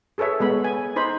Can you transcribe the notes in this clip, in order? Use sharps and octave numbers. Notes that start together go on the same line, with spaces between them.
G#4 A4 B4 C#5 E5
G#3 B3 B5
G#5
D#4 C5 B5